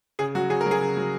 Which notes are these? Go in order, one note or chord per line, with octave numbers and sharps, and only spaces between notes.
C#3 G#4
F#3 F#4
C#3 G#4
A#4
F#3
G#4
C#3
F#3